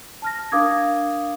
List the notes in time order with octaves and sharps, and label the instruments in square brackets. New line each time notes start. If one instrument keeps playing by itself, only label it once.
[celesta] A5 F6 A#6
D4 A#4 F5 D6 D#6 G#6